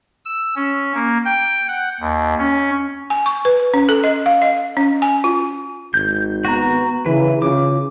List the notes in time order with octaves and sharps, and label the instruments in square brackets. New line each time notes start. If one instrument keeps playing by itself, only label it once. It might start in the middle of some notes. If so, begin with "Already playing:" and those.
[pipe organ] E6
C#4
A#3
G5
F#5
D#2
C#4
[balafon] G#5
C#6
B4
C#4
A4
D#5
F5
D#5
C#4
G#5
F4
[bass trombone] G#1 [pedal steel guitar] G6
[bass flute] B3 [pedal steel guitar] F#4 A#5
[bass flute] C#3 [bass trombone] E3 [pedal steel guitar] E4 B4
[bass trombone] C#3 [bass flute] F4 [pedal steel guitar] D6